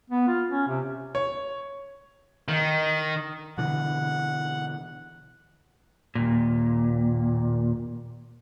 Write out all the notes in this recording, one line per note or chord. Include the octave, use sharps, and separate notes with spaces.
B3
F4
C#4
C3
C#5
D#3
B2 D3 E3 F#5
D#2 A#2